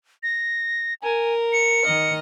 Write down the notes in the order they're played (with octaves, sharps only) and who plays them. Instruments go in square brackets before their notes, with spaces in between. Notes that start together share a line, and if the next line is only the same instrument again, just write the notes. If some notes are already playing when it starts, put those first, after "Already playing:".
[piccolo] A#6
[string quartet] A#4 [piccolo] G#5
[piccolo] C#7
[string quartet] D#3 D#5 F6